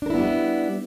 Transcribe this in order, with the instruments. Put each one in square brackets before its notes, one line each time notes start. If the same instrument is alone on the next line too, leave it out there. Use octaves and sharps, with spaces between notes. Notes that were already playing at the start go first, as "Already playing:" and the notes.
[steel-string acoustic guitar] D4
A#4
E4
B3
G3